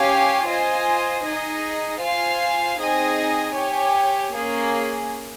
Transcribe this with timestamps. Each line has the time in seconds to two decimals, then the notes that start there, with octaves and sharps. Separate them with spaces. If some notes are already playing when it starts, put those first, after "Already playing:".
Already playing: C#4 G4 C#5 F5 G#5
0.47 F4 C5 D#5 G#5
1.23 D#4 G#4 D#5
2.00 F4 C5 F5 G#5
2.78 C4 D#4 G#4 D#5 G#5
3.54 G4 C#5 G#5
4.31 A#3 C#4 G#4